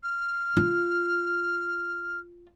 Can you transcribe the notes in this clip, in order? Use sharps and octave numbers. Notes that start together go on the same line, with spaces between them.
F6
F4